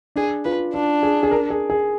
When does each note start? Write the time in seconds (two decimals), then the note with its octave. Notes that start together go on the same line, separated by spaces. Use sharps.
0.16 D4 G#4
0.45 F4 B4
0.73 D4 F4
1.03 G#4
1.23 G#4
1.31 A#4
1.50 G#4
1.70 G#4